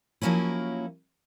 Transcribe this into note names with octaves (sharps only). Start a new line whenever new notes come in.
F3 F#3 A#3 C#4 E4